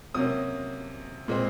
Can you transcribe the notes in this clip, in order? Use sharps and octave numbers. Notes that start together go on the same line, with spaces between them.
C3 F#3 A#3 C#4 D#6
A#2 G#3 C4